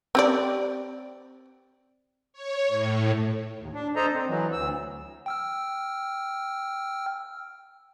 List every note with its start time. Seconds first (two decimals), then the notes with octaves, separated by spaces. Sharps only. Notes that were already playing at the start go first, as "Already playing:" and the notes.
0.15 C4 G4 D5
2.33 C#5
2.68 A2
3.58 D#2
3.74 D4
3.96 D4 A4 C5 D#5 A#5
4.13 C4
4.28 E3 F#3
4.52 D2 E6
5.26 G5 E6 F6